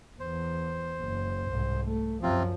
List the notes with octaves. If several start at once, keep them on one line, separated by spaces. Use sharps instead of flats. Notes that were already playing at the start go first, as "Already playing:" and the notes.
E2 C5
F#1
C2 G#2
A3
F#2 C3 F3 C4 F4